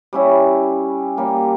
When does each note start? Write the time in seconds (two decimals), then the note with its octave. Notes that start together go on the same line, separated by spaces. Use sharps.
0.13 G3 C#4 E4
1.18 G3 A#3